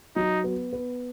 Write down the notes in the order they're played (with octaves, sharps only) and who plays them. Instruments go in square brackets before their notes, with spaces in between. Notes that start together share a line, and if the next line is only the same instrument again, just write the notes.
[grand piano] F#3 [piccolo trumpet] D#4
[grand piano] B3
B3